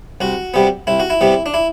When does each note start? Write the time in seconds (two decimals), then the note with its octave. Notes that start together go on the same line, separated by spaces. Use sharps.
0.21 C2 F#4
0.54 C3 G3 B3
0.87 C2 E4
1.00 F#4
1.10 E4
1.21 C3 G3 B3
1.46 D4
1.54 E4